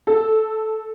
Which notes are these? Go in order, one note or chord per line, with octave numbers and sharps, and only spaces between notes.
A4